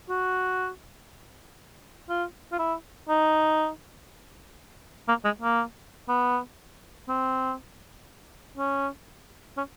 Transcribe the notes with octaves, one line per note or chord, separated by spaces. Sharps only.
F#4
F4
F4
E4
D#4
A#3
G#3
A#3
B3
C4
C#4
C#4